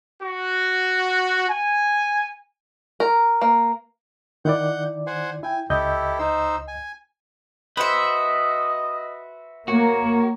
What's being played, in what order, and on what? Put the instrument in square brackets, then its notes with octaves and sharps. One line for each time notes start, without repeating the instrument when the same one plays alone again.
[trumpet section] F#4
G#5
[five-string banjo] A#4
A#3
[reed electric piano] D#3 E4 D5 [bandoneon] F#5 G6
[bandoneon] C5 F#5 G#5
[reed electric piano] E4 G5 [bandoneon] G#5
[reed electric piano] C#2 D#5 G6 [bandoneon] E4 G4 A4
[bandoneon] D#4 C5 E6
G#5
[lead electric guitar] F#4 B4 [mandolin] C5 E5 [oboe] D#5
[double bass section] A#3 [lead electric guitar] F#4 [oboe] C#5